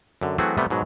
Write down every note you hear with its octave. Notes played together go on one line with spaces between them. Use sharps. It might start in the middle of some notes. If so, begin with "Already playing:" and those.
F#2 D3
E3 F#3 A3 C4 F#4 G#4
C3 G3 A3 B3
G#2 B2 F#3